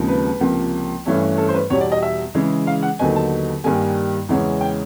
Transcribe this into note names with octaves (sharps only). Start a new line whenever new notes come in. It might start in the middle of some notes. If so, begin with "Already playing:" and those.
Already playing: D#2 C#3 F3 G#3 C4
B4
C#2 C3 F3 A#3
G2 E3 A3 C#4
A4
C5
B4
E2 B2 G3 C#5
D5
D#5
E5
C#3 E3 G#3
F5
F#5
D#2 D3 F#3 B3 D#4 G#5
A5
G2 D#3 G3 A#3 G#5
E2 C#3 E3 G#3 C#4
G5